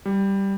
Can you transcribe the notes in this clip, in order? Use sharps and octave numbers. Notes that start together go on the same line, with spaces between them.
G3